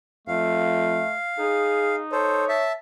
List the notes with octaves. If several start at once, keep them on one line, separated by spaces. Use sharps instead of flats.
F2 A3 F5
D#4 G#4
A4 C5 C#5
E5 A5